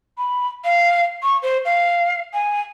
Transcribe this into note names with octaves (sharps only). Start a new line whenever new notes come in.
B5
F5
C#6
C5
F5
G#5